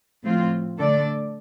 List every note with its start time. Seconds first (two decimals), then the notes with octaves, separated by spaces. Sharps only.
0.23 A2 F3 C4 F4
0.78 D3 A3 D4 A4 D5